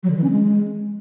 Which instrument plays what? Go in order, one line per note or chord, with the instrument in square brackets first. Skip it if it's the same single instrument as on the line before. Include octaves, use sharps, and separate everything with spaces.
[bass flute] F#3
D3
E3
C#4
G#3